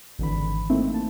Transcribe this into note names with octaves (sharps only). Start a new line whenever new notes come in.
G#1 D3 E3 B5
A3 A#3 C4 D#4 E4
A5